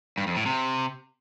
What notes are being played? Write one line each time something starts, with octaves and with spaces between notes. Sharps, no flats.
G2
F2
A2
C3